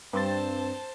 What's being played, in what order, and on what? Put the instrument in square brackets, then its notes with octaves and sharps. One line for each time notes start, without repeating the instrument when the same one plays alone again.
[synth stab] G2 C4 A6 [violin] C5 A5